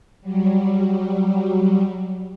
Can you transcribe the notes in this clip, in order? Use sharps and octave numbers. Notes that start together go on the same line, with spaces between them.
F#3 G3